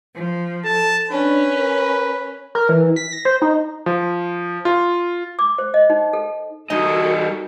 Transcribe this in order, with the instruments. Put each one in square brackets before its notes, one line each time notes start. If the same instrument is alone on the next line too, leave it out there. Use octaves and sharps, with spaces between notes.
[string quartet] F3
[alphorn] A4 [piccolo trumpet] A5
[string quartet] C#4 [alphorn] D4 [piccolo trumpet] B4
[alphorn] A#4
[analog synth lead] A#4
E3
B6
A#6
C5
D#4
[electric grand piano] F3
F4
[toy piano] D6
C5
D#5
D#4
A4
[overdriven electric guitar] G3 D#5 [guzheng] D#4 [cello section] F#4 A4 A#4